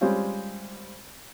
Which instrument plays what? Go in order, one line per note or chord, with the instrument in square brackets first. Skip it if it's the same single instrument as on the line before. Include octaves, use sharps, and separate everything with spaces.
[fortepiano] G3 G#3 C4 C#4 F4